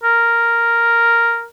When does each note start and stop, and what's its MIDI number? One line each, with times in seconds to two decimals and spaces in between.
0.04 1.45 70